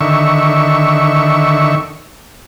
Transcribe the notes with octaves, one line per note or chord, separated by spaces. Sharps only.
D3 D#3 E5 C#6